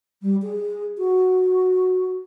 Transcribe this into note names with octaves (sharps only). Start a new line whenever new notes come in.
G3
G#4
F#4